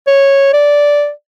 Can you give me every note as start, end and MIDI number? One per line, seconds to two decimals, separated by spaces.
0.07 0.52 73
0.53 1.11 74